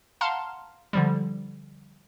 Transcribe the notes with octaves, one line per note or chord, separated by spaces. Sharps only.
F5 F#5 A5 A#5 C6 F6
D3 F3 G3